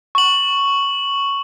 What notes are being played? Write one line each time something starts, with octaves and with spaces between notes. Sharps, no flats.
C#6 F#7